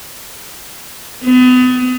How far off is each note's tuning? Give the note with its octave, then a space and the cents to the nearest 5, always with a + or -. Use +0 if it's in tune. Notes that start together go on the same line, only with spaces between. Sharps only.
B3 +35